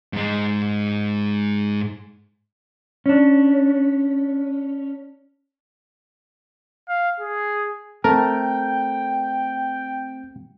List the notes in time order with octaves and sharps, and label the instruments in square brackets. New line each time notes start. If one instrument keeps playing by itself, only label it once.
[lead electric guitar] G#2 G#3
[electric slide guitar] C#4 D4
[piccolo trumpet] F5
G#4
[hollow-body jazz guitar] A3 A4 [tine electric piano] C4 [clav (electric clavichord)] A#4 [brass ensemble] G5